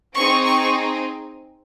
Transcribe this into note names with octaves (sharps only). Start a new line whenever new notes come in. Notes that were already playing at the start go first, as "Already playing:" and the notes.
C4 D#4 G#4 C#6
C#6